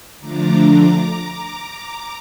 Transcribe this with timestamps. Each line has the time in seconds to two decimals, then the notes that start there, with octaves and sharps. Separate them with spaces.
0.19 D3 F3 A3 D4 A#5 D6